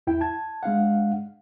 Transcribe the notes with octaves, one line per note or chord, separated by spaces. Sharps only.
E2 E4 G5
A5 G#6
G#3 D4 F5 F#5